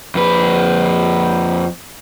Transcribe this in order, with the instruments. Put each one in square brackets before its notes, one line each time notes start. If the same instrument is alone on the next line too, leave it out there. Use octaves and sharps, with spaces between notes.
[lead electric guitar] F2 B4